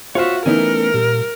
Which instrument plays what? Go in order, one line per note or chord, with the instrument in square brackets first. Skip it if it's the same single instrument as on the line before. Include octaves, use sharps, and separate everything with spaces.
[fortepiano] F4 C5 F5 [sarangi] F#4 [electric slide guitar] C#5 E5
[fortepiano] E3 D#4 [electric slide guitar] A3 B3 C#4 [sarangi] A#4
[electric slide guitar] A#2 [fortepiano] G3